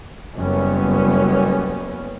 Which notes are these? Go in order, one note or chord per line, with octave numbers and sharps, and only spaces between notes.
F#1 F#2 G3 B3 C#4